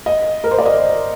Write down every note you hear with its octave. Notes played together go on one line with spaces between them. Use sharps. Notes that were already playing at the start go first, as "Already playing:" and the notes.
D#5
A#4
C5
D5
D#5